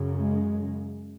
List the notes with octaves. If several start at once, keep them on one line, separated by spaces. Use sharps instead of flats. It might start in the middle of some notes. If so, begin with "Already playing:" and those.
Already playing: F#2 C#3
G#3